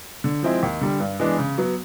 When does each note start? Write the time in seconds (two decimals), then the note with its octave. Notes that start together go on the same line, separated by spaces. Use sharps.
0.24 D3
0.43 F3 G#3 C4 E4
0.63 D#2
0.81 D3 G3
1.00 G2
1.19 E3 G#3 B3 D4
1.38 C#3
1.58 F#3 B3